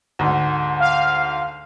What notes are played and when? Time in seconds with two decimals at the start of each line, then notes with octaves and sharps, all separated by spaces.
0.19 D2 G#2
0.80 F5